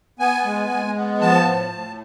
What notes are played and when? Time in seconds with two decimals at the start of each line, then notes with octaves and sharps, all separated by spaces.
0.19 B3 G#5
0.45 G#3
0.70 G#3
0.96 B3
1.21 F3 A5
1.46 A2
1.72 A2